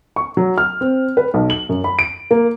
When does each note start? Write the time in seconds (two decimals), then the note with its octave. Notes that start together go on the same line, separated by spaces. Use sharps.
0.16 C#6
0.37 F#3
0.58 F6
0.81 C4
1.17 B4
1.34 B1
1.50 F#7
1.69 F#2
1.84 B5
1.99 D7
2.31 A#3